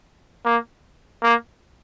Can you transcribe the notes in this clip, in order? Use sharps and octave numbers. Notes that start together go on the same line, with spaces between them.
A#3
A#3